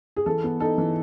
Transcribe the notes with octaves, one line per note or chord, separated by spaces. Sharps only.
G#4
E3 A4
B3
D#4 A4
E3